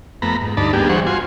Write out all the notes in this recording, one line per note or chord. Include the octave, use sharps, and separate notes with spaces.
F2 A3 B3 A#5 B5
G#2
D2 G2 D#4 D5 A5 B5
G3 A#3 B3 D4 G4 G#4
E3 G3 G#4 C5 F#5 C#6
F4 F#4 G#5 C6